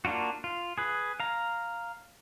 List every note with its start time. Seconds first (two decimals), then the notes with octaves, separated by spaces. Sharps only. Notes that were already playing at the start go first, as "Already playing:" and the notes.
0.05 A#3 D4 F4 F#4
0.44 F4
0.78 G#4 B4
1.20 F5 A#5